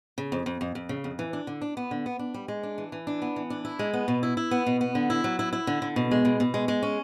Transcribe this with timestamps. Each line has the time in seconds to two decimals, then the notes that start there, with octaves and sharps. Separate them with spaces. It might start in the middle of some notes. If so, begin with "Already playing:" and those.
0.18 C#3
0.32 F2
0.46 F2
0.61 F2
0.75 F2
0.89 C#3
1.04 F2
1.19 E3
1.33 D4
1.47 D3
1.61 D4
1.77 B3
1.91 D3
2.06 B3
2.19 D4
2.34 G3
2.48 G#3
2.63 D4
2.78 E3
2.92 E3
3.07 D4
3.22 B3
3.36 E3
3.50 D4
3.65 E4
3.79 G#3
3.93 B3
4.08 B2
4.23 E4
4.37 E4
4.51 B3
4.67 B2
4.81 B3
4.95 D3
5.10 E4
5.24 F#3
5.39 E4
5.53 E4
5.67 D3
5.82 D3
5.96 B2
6.11 G#3
6.25 B2
6.40 B2
6.54 G#3
6.68 G#3
6.83 C#4